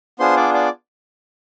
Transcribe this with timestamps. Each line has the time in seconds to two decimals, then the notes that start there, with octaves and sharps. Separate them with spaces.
0.19 B3 D4 F4 G#4 C5 C6
0.37 D5 D6
0.54 D5 D6